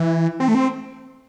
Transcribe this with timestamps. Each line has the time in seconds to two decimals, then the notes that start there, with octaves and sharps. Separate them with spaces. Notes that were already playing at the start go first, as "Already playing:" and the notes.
Already playing: E3
0.40 C4
0.48 A3
0.55 C4